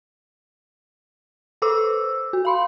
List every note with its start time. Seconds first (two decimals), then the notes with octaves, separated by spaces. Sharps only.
1.62 A4 B4 C5 D6 E6
2.33 F#4
2.45 F5 B5 C6